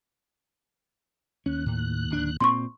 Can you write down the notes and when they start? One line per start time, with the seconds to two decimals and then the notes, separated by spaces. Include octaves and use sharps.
1.46 D#2 C#4 F#6
1.66 A2
2.10 D1 D4
2.40 A#2 C4 C6 C#6